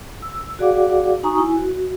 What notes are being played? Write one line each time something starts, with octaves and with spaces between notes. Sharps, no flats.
E6
F#4 G#4 D5 F5 F#5 D6
D#4 F#4 G#5 A#5 C#6 D#6
E4 G#5
F#4